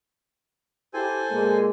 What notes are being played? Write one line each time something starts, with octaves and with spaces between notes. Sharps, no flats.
E4 G4 A4 C5 G#5
A#2 G#3 A#3